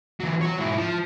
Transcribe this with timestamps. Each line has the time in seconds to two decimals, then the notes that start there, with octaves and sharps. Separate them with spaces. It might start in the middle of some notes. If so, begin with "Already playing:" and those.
0.20 E3 F#3
0.41 F#4 C#5
0.59 G#2 E4
0.77 F3